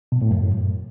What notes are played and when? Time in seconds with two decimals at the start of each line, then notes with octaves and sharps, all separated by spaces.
0.12 B2
0.21 A2
0.31 F#2